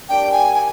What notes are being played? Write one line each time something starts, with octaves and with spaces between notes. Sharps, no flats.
G3 A#3 D4 G5
G#5
G#5